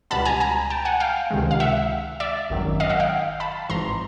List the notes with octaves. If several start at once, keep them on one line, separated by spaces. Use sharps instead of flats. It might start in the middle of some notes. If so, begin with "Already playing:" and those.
C#2 B2 G3 B3 A5 B5
G#5 A#5
G#5 A#5
G5 A5
F#5 G#5
F5 G5
C#2 C3 D#3 G#3
F5
E5 F#5
D5 E5
G#1 F#2 D#3 F#3
D#5 F5
E5 F#5
F5 G5
A5 B5
G#1 G#2 E3 A#5 C6